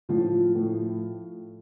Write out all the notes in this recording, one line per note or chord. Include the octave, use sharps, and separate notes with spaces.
A2 F3 F4
A2